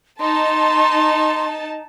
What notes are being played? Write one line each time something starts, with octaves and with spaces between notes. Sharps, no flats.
D#4 A5 C6